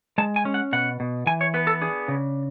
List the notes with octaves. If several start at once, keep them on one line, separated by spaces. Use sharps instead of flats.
G#3 A5
G#5
C#4
F#5
B2 F#5
B2
E3 G#5
C#5
B3 B4
A4
D4 G#4
C#3